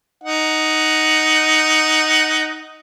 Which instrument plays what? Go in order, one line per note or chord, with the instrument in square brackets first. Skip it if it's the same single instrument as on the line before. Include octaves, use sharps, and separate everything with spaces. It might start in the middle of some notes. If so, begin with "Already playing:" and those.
[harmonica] D#4 F#5